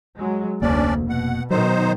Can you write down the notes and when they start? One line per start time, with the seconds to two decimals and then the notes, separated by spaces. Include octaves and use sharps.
0.16 F#3 G#3
0.62 F1 D2 A#3 C#4 D4 D5
1.09 B2 F#5
1.50 B2 D#3 F#3 D#4 C5